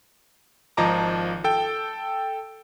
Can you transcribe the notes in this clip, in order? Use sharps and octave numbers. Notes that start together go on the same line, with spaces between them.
G#1 F3 D#5 A5 A#5 D6
A4 G5